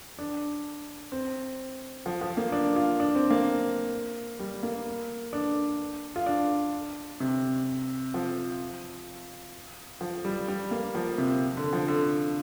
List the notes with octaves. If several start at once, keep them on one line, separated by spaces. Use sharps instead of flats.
D4
C4
F3
F3
A#3
D4
F4
D4
C4
A#3
G3
A#3
D4
F4
D4
C3
F3
F3
G3
G3
A#3
F3
C3
D3
F3
D3